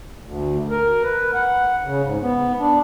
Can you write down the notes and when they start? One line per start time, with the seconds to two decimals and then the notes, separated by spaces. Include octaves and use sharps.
0.25 D2
0.70 A#4
1.03 B4
1.34 F#5
1.84 C#3
2.03 G#2
2.22 B3
2.60 D4